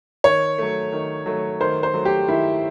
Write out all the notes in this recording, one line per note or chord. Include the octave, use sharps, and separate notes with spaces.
D#3 C#5
F#3 A3
D#3
F#3 A3
D#3 C5
C5
F#3 A3
G4
D#3 E4